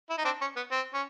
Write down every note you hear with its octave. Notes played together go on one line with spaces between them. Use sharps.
E4
D#4
C4 D4
C#4
B3
C4
C#4